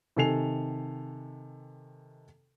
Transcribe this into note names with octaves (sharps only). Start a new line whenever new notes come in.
C3 D#3 A4 G#5 C7 F7